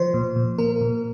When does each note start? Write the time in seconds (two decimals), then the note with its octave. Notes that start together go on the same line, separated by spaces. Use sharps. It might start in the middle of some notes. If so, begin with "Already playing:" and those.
Already playing: F3 C5
0.14 A#2
0.36 A#2
0.58 A#3 A#4
0.81 A#2